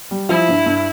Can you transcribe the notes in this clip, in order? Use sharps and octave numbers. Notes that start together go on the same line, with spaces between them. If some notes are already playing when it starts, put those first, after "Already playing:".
G3
F3 E4
G2
G2